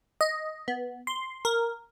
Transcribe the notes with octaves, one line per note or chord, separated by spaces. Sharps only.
D#5
B3
C6
A#4